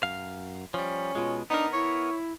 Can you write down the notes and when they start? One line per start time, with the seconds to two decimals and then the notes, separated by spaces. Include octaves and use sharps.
0.03 F#2 F5
0.74 F3 G3 C#4
1.15 B2 G#3 F4
1.50 B3 D4 D#4 A#4
1.73 E4 C#5